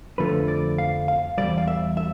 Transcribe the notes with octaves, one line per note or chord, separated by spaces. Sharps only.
F2 D3 F3 A3 B4
D5
F5
F5
E2 B2 G3 D5
F5
E5
E5